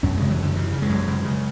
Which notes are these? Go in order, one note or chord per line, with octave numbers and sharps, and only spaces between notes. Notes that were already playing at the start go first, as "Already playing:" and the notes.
F#2 C#4
C#3 G#3
E3
F#2 D3
C#3 E3
C#3
G#3
F#2
C#3
C#3